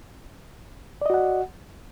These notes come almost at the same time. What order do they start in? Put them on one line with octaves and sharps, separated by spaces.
D5 D#5 F#4 F#5